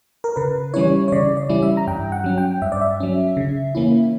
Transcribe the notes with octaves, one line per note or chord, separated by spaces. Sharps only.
A#4
C#3 B4
E3 G3 C#4 E4 C#5
C#5
C#3 D5
D5
E3 G3 C#4 E4
E5
A#5
G2 G5
F#5
F#3 C#4
G5
G2 E5
D5
E5
F#3 C#4
C#3
E3 A#3 C#4 E4